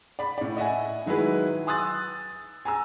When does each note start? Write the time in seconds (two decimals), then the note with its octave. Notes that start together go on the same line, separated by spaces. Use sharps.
0.19 D5 B5
0.38 A2 D5
0.57 D#5 E5 F#5 G#5
1.06 D#3 F#3 G#3 E4 B4
1.67 G#5 C6 D#6 E6 F#6 A6
2.65 G#5 A#5 E6